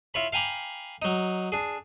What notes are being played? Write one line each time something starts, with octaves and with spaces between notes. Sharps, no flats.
E4 F4 C#5 B5
F5 G5 G#5 A#5 B5 D6
F#3 D#4
D4 G#4